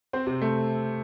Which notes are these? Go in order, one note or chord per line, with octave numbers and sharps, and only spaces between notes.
C4 C5
C3
A3